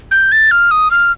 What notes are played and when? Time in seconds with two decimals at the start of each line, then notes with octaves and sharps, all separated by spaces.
0.11 G6
0.32 A6
0.51 F6
0.71 D#6
0.91 F6